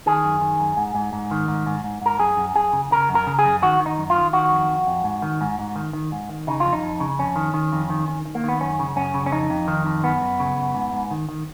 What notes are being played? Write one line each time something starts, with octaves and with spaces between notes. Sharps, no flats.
D#3 G#4
F#2
D#3
F#2
G#2
G#2
G#2
D#3
G#2
G#2
G#2
G#2 A#4
F#2 G#4
F#2
F#2 G#4
C#3
C#3 A#4
F#2
A#4
C#3
G#4
F#2
D#3 F#4
D#3
D#4
F#2
F4
D#3
D#3 F#4
F2
F2
F2
G#2
D#3
G#2
G#2
D#3
D#3
G#2
D#3
C#3 D#4
F2 F4
D#4
F2
C#3
F2 C#4
D#3
D#3
F2
D#3
D#3
D#3
A#3
D#3 B3
F#2 C#4
C#3
F#2 C#4
C#3
C#4
F2 D#4
F2
D#3
F2
F#2 B3
F#2
C#3
F#2
G#2
G#2
D#3
D#3